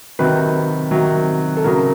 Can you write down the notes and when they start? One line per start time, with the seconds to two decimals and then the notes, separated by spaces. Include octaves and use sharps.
0.19 C3 D#3 F#3 B4
0.91 C3 D#3 F#3
1.57 A4
1.64 C#3 F#3 A#4